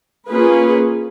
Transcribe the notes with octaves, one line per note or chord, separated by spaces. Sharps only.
A#3 C#4 F4 G#4 B4